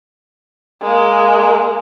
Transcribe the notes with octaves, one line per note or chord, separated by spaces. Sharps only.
G#3 A#3